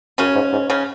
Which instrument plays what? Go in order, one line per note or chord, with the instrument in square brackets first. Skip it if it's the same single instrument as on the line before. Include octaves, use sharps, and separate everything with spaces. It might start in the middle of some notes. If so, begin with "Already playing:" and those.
[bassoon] F#2 [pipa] C#3 C#4
[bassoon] G#2
G#2
[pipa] C#3 C#4